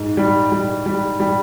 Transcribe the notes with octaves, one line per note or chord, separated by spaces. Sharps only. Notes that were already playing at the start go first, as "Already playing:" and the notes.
Already playing: G#2
G3
G3
G3
G3